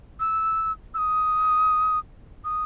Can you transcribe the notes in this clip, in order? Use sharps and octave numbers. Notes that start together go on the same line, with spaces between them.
E6
E6
D#6
D#6